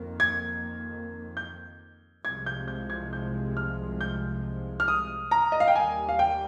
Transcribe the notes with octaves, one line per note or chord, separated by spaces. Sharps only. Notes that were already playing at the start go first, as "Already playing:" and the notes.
Already playing: F2 D#3 A#3
G#6
G6
C2 C3 F3 G#3 G#6
G6
G6
G#6
G6
F6
G6
F6
D#6
A#5
D#5
F5
G5
D#2 D#3 G3 A#3 G#5
F5
G5